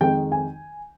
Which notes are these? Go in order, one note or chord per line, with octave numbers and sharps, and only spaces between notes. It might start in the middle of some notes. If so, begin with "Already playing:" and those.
F2 D#3 G#3 G5
G#5